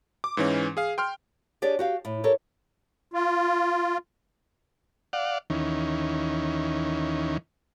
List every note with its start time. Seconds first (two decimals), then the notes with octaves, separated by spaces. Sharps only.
0.24 D6
0.37 G#2 E3 C#4
0.77 G#4 F5
0.98 G5 C6 F6
1.62 D4 G4 G#4 C#5 D5
1.79 F#4 G4 F5
2.05 A2
2.24 G4 A4 A#4 C#5
3.13 F4
5.13 D5 F5 F#5
5.50 D#2 D#3 E3 C#4